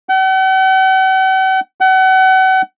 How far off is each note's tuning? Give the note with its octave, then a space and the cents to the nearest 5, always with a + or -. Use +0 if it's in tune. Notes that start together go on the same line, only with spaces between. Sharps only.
F#5 +45
F#5 +35